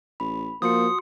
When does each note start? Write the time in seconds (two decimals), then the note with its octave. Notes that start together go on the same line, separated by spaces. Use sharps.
0.20 A1 B5
0.62 F3 A#3 F#4 C6 D#6 C#7